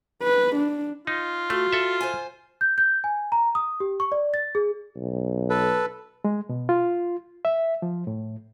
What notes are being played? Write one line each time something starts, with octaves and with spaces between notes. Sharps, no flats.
B4
D4
D#4 F4
A3 F#4
A4 E5
C5 G#5
G6
G6
G#5
A#5
D#6
G4
C#6
D5
A6
G#4
B1
A4 B4
G#3
B2
F4
E5
F3
A2